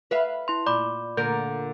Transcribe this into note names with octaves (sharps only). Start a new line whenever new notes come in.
B4 E5 F5
E4 C6
A#2 D5 B5 D6
A#2 D3 A#4 G6